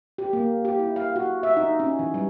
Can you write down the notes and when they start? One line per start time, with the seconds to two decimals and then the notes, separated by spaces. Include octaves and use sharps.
0.18 G4
0.33 A#3
0.65 G4
0.79 E4
0.96 F5
1.16 F#4
1.43 E5
1.57 D#4
1.80 C#4
1.99 E3
2.14 G3